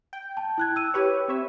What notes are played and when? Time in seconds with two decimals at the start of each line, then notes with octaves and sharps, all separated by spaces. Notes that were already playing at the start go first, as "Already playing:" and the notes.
0.13 G5
0.37 A5
0.58 E4 F#6 G#6
0.76 E6 D#7
0.94 G4 B4 C#5
1.28 C4 C#5 E5